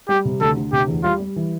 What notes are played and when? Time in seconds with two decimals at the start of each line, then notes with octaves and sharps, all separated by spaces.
0.09 G3 G4
0.25 C3
0.41 D2 A4
0.57 D2
0.73 C3 G4
0.88 E2
1.04 G3 F4
1.20 G3
1.36 E3